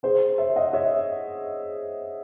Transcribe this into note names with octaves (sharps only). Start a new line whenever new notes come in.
G#4 C5
C#5 E5
D#5 F#5
C#5 E5